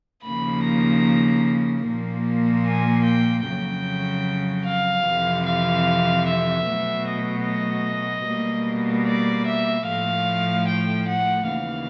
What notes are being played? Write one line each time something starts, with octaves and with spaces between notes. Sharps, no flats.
D#2 C#3 F3 A#3 B5
A#5
A#2 F3 A#3
G#5
G5
F2 C#3 F#3 G5
F5
F2 C3 E3
F5
E5
B2 F#3 A3
D#5
D#5
B2 G3 A#3
D5
E5
A2 F3 A3 F5
G5
F#5
D#2 C#3 E3 F5